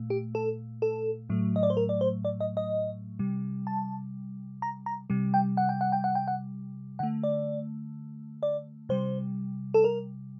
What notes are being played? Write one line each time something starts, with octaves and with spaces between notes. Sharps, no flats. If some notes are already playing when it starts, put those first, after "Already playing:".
Already playing: A#2 A3
G4
A4
A4
A2 F#3 A3
D#5
D5
C5
A#4
D5
C5
D5
D#5
D#5
C3 G3
A5
A#5
A#5
C3 G3
G5
F#5
G5
F#5
G5
F#5
G5
F#5
D3 A3 F#5
D5
D5
C3 G3 C5
A4
A#4